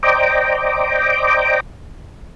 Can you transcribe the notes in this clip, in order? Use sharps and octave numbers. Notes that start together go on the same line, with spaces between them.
C5 D5 D#5 G5 A#5 D6